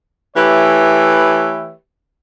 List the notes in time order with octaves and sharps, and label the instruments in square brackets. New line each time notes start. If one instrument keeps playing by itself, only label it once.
[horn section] E3 A3 G4 B4 C#5 E5